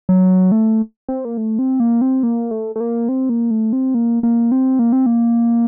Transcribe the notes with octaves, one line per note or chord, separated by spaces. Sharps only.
F#3
A3
C4
A#3
A3
C4
A#3
C4
A#3
A3
A3
A#3
C4
A#3
A3
C4
A#3
A#3
C4
A#3
C4
A#3